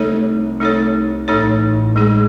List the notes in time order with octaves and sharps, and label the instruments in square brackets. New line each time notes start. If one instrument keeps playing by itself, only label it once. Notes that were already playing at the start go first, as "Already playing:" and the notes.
Already playing: [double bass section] C2 C3 [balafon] A3 D#4 A4 C#5
[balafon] A3 D#4 A4 C#5
[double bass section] A1 A2 [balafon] A3 D#4 A4 C#5
[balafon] G#3 D#4 G#4